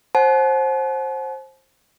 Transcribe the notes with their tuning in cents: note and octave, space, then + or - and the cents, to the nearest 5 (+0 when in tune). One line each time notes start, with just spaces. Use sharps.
C5 +20 F#5 +0 A5 -45